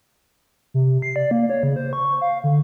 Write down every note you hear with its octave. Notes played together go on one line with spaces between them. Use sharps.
C3
C7
D5
A#3
C#5
C#3
C5
C#6
F5
D3